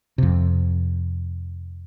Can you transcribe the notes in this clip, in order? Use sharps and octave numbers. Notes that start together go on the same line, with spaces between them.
F2 C3